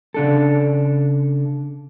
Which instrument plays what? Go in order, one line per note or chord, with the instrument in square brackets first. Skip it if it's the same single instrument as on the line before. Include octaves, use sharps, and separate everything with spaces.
[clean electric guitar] C#3 D4 A4